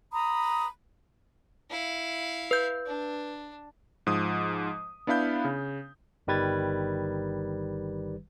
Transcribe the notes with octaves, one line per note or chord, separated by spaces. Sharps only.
A#5 B5 D#6
E4 F5
B4 G6
D4
G#2 F3 D#6
B3 D4 E4 F5 B5 G6
C#3
G1 D#3 G3 B4 G#6 A6